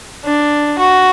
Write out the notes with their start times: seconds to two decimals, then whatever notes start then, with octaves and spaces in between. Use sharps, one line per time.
0.25 D4
0.78 F#4